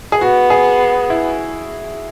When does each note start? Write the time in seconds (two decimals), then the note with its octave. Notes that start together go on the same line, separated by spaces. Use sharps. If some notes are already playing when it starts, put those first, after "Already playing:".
0.12 G#4
0.20 B3 F#4
0.50 G#4
1.10 E4